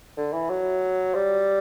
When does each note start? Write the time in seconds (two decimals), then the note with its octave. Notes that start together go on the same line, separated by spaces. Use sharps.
0.17 D3
0.33 E3
0.50 F#3
1.14 G3